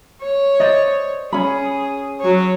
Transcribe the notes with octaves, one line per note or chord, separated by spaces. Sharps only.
C#5
C5 D5 D#5
C#4 G#4 B5
F#3 C#5